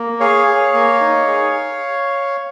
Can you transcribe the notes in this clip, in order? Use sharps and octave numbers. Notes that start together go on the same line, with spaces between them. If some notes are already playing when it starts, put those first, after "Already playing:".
Already playing: A#3
G#4 C#5 F5
G#4
A#3
D#4
G#4